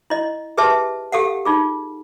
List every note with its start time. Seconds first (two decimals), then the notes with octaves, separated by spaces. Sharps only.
0.10 E4 D#5
0.57 G4 G#4 B4 E5 A5
1.12 G4 A4 F5 F#5
1.45 D#4 F4 G#4